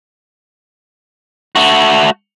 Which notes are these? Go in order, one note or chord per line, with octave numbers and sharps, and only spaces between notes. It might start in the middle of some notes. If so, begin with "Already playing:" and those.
A3 F#4